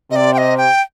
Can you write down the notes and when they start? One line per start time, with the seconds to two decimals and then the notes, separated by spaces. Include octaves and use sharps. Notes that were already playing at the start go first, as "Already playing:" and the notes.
0.11 C3 D5 D#5
0.34 G5
0.38 D#5
0.57 G5